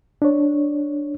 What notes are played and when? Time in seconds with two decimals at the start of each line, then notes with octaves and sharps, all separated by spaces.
0.22 D4 C#5